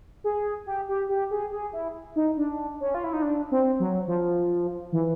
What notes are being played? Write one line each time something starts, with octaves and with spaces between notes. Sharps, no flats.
G#4
G4
G4
G4
G#4
G#4
E4
D#4
D4
C#4
F4
E4
D#4
D4
C4
F#3
F3
E3